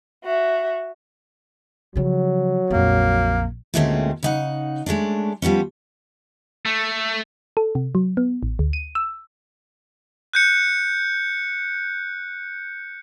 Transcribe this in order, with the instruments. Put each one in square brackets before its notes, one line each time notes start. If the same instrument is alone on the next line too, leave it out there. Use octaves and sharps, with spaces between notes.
[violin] F#4 E5
[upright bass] C#3 F3 [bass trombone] F#3
[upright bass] A#1 F2 [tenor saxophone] A#3
[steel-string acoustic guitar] D2 A#2 G#3 A3 C4 C#4
C#3 D#4 F#5
G#3 A3 C#4 D4
F3 G3 B3 C#4
[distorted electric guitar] A3
[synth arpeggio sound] A4
C3
F#3
B3
A1
D2
D#7
E6
[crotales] F#6 G6 C#7